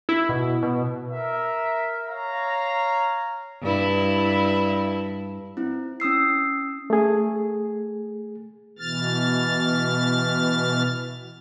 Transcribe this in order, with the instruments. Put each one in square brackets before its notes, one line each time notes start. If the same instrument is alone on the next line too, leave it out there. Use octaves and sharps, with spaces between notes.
[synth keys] E4
B2
B2
[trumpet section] A#4 E5
C#5 F5 A#5
[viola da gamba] G2 E4
[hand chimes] C4 E4
C#4 D#6 E6 C7
[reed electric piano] A3 G#4
[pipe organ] B2 E3 F6 A6